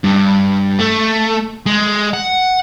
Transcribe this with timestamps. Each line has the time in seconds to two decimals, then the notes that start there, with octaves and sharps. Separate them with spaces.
0.04 G2
0.79 A3
1.66 G#3
2.14 F#5